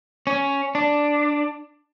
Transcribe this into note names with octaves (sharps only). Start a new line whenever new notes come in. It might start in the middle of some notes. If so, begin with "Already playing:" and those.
C#4
D4